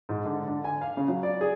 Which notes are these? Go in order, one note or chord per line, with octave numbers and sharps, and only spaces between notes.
G#2
D3
D3
G#5
F5
C#3
F#3
D5
G#4